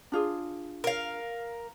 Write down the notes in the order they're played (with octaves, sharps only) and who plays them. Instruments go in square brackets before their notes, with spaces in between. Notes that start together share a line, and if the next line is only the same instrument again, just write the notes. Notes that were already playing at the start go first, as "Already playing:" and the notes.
[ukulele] D4 F4 G#4
[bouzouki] A#4 F5